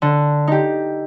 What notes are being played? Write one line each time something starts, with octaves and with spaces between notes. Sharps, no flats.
D3
D#4 G4